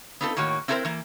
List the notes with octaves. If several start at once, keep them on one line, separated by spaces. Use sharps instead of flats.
B3 C4 D#4 F4 A4
A2 D#3 A#3 F#4 C#5
C4 E4 F#4 A4 A#4 C5
E3 A#3